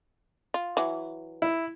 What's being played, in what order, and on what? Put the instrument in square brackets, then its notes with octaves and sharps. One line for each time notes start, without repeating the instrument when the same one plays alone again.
[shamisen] F4
E3 F#3
[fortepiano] E4